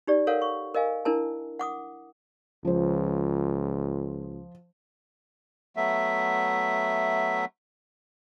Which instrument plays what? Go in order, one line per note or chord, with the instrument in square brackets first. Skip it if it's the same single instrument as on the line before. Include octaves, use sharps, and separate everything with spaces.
[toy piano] D#4 G4 D5
A4 A#4 C#5 F5 F#5
C#6
A#4 D#5 F5 G#5
D4 E4 A#4 A5
F#5 D6 D#6
[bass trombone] C#2 [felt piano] F3 C5
[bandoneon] F#3 A3 B3 E5